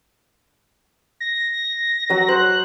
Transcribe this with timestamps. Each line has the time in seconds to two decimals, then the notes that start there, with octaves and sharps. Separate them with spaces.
1.20 A#6
2.10 F#3 F#5
2.29 C5 F#6